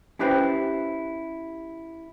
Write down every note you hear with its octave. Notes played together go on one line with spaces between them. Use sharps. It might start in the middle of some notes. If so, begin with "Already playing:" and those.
C#4 E4 G4 B4 C5 G5